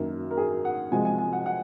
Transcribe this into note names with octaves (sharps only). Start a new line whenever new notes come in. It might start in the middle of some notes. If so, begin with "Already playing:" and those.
Already playing: F#2 D#3 A#3 A#4
A#4
G#4
F#5
C3 F3 G#3 G#5
G#5
G#5
F#5
F#5